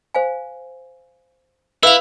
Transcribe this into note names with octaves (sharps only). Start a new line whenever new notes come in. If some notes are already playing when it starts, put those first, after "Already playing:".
C5 F5 G#5
E4 B4 E5 F5 E6 F7